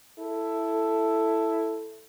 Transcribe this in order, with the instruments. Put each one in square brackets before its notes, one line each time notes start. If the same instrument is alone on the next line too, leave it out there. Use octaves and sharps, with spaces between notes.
[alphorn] E4 [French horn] A4